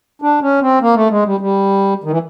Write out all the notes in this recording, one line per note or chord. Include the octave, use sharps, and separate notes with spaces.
D4
C#4
C4
A#3
A3
G#3
G3
G3
D#3
E3